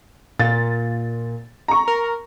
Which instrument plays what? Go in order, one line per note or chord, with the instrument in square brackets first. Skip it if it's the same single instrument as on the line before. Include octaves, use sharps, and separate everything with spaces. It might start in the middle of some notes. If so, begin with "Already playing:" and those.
[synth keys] A#2 [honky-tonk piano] A6
[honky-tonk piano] A#5 C#6
[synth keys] A#4